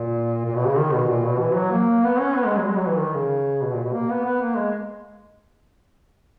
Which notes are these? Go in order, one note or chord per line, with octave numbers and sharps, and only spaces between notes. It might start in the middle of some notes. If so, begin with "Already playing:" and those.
Already playing: A#2
A#2
B2
C#3
D#3
B2
A#2
B2
E3
F#3
A#3
B3
C#4
B3
G#3
F#3
G#3
F#3
E3
D#3
C#3
B2
A#2
B2
A#3
B3
B3
A#3
G#3